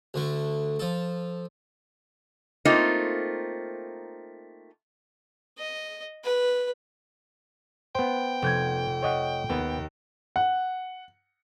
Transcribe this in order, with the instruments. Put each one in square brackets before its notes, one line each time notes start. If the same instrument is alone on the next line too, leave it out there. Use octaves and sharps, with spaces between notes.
[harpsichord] D2 D3 A3
F3 A4
[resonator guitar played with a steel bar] A3 A#3 C4 D#4 F4
[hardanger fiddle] D#5
B4
[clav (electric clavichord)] B3 C5 [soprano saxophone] G5
[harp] F1 G6 G#6
[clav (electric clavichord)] C#5 D#5 F#5
[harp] D#2 [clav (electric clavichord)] B3
[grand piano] F#5